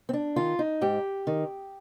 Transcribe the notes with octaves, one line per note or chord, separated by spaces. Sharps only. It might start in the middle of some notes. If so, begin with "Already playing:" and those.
C4
D4
D#3 F4
D#4
G#2 G4
D#3